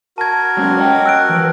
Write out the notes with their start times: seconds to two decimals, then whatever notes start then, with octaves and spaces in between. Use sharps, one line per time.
0.18 F#4 A#4 A5 G#6
0.57 F#3 G#3 C#4
0.77 C#5 D#5 G5
1.06 E6 F#6 D7
1.29 E3 F3